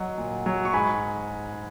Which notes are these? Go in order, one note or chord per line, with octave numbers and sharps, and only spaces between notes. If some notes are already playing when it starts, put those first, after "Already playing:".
Already playing: F#3 D#5 F#5
A#2
F#3
C#6
G#2 G#5 B5